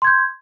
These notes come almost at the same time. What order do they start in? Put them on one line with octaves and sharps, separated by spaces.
C6 G#6 G6